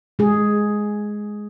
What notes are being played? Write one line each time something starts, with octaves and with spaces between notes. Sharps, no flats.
G#3 G#4